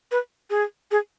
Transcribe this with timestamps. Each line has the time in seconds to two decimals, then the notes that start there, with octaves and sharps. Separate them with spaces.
0.11 B4
0.50 G#4
0.91 G#4